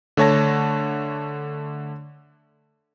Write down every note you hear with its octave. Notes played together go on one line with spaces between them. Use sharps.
D3 A3 C#5 A5 A#6